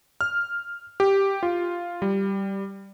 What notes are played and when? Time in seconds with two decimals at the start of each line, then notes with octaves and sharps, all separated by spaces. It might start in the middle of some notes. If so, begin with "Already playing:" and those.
0.21 F6
1.00 G4
1.43 F4
2.02 G3